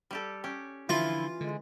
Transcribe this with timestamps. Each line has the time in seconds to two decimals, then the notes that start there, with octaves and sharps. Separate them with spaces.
0.11 G3 G4 A4
0.44 C#4 G4
0.89 D3 E3 F3 E4 F4
1.41 D3 G#3